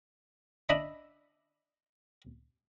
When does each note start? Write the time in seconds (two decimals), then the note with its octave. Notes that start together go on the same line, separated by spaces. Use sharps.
0.69 D4 D#5 E5 B5